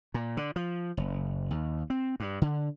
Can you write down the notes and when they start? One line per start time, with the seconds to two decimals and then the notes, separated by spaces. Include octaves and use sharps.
0.14 A#2
0.37 D3
0.56 F3
0.97 F#1
1.51 D#2
1.90 C4
2.20 G2
2.42 D3